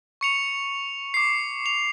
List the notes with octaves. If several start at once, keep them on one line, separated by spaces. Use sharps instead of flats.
C#6 C#7 F7
D6 C7
F7